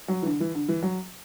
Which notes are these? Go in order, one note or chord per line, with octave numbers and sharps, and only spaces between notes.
F#3
E3
D3
E3
D3
E3
F#3